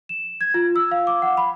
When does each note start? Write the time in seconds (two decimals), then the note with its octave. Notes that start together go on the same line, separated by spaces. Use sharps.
0.09 E7
0.41 G#6
0.54 F4
0.76 E6
0.91 F5
1.07 D6
1.22 F#5
1.37 B5